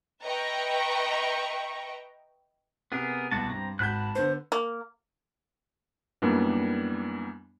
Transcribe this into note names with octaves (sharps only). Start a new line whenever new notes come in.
B4 D#5 E5 G5 A#5 C#6
C3 B3 G#4 A#4
C2 B2 F#4 A5
G2 C4 A#5
G#1 F#4 A5 B5 F#6 G6
D3 B3 C5
A#3
F#2 E3 G3 A#3 B3 D4